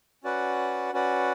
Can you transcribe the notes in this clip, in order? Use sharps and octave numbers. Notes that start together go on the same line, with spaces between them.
C#4 F#4 B4 D5 F#5
C#4 F#4 B4 D5 F#5